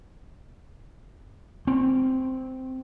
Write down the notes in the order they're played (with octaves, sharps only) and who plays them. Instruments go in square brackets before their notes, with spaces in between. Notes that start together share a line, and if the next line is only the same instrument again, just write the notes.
[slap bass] C4